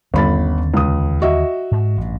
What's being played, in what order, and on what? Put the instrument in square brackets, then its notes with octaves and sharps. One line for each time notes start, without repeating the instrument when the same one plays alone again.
[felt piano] G1 B5 A6 [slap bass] D#2 D3 C#4
[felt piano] C#2 D#6
F#4 D#5 E5
[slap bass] G#2
A1 G2